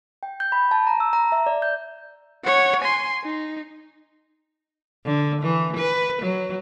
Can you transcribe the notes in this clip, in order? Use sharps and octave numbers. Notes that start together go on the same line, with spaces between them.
G5
G6
B5
A5
A#5
E6
A#5
E5
D5
G6
C#5 F#5
G#5 C6
D#4
D3
E3
B4
F#3